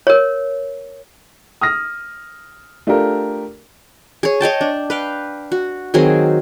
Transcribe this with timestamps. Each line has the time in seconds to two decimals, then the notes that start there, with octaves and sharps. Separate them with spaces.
0.07 A#4 C#5
1.61 D#6 F6 A#6
2.87 A3 D4 F4 G4 A#4
4.23 G#4 C#5
4.40 C#5 D#5 G5 A5
4.61 D4
4.90 B4 F5 G5
5.52 F#4
5.94 D#3 F#3 C4 G#4